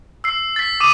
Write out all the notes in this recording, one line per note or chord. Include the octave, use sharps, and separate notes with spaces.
E6 C7
A6 B6
D6 D#6 D#7